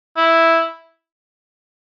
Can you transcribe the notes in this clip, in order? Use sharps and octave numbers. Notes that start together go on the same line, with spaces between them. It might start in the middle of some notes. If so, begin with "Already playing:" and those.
E4